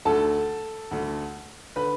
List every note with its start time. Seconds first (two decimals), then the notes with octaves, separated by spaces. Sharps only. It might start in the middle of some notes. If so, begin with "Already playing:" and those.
0.05 D2 D3 A4 A5
0.91 D2 D3
1.76 D3 B4 B5